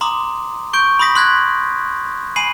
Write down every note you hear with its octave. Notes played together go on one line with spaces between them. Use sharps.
A#5 C6 D6 D#6
C#6 G6 D7
B5 C6 D#6 A#6 B6
C6 F#6 G#6 B6 F#7
G#5 B5 C7 D#7 F#7